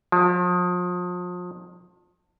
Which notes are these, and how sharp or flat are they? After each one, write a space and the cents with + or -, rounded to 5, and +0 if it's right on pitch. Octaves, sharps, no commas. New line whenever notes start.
F3 +35